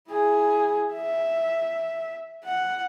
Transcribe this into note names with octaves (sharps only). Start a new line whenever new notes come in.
E4 G#4
E5
F#5